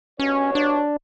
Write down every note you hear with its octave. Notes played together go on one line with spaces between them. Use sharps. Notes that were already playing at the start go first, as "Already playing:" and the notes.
G2 B2 C#4 C#5
D4